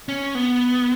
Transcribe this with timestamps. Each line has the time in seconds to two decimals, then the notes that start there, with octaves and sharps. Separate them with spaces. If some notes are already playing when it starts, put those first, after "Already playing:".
0.09 C#4
0.35 B3